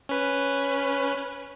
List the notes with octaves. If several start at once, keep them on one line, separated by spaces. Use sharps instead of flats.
C#4 B4